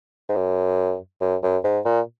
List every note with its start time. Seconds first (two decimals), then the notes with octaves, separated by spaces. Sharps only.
0.29 G#2
0.36 F#2
1.21 F#2
1.42 F#2
1.64 G#2
1.85 A#2